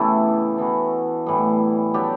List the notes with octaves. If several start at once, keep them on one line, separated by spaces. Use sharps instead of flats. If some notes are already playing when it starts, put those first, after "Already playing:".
Already playing: C#3 E3 A3 B3 E4 G4
E3 B3 F#4
A2 E3 G3 B3
F#3 B3 D4 G4